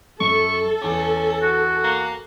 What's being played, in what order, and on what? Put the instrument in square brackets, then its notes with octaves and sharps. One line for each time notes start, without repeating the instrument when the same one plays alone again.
[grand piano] F#2 [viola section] A4 [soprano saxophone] C#6
[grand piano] E2 A5 D6 [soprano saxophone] C#4
[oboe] F#4
[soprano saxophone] A#3